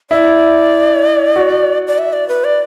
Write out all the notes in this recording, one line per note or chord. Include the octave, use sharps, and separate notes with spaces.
E4 D5
F#4
D5
E5
D5
B4
D5